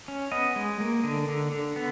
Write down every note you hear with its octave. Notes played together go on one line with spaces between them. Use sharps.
C#4
B3 D#5
G#3
A#3
D3
D3
D3
B3